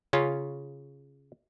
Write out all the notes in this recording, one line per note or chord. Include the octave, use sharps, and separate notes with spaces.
C#3 C#4 F4